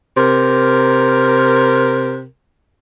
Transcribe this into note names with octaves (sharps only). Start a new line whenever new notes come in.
C3 A#4